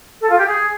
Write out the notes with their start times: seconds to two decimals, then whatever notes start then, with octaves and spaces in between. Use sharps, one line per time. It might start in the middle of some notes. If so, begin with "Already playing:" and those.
0.21 A4
0.29 F4
0.38 G4
0.46 G#4